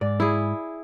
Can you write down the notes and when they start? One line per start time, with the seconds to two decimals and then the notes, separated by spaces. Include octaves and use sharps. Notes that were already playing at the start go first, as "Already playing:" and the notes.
0.01 G#2 D5
0.20 E4 G#4